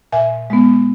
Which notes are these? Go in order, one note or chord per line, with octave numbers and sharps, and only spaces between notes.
A#2 E5 G#5
G#3 B3